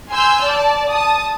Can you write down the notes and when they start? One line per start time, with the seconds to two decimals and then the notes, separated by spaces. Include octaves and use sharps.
0.10 G#5 C6 E6 F6 G6
0.42 D5 A5
0.89 A5 D#6